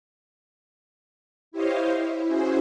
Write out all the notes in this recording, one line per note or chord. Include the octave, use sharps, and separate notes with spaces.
E4 G4 C5 C#5 D#5 F5
E4
C#4 E4 F#4 G#4 C5